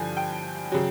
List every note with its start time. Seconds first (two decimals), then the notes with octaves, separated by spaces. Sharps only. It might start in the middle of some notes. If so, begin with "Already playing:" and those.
Already playing: G2 D3 F3 G#5
0.17 G5
0.72 C#3 F#3